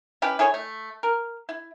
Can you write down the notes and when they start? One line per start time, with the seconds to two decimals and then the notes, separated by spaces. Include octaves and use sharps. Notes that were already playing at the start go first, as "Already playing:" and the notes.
0.22 C#4 E4 G4 B4
0.39 E4 G#4 A4 C#5
0.54 A3
1.03 A#4
1.49 E4